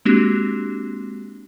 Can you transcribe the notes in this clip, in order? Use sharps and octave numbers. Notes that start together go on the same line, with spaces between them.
G#3 A#3 C4 D4 F#4 G4